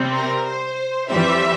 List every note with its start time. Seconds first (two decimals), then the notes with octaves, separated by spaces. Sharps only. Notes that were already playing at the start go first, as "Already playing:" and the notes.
Already playing: C3 G3 C4
0.14 A#4
0.46 C5
1.09 F2 E3 G3 C4 E5